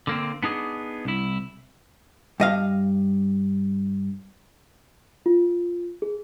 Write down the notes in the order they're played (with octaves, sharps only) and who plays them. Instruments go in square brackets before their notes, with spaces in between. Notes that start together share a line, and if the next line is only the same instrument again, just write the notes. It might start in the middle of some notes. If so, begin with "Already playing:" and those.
[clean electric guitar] D3 A#3 C4
B3 D4 D#4 G#4
C2 E4
[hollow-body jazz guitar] G2 D#5 F5
[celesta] F4
G#4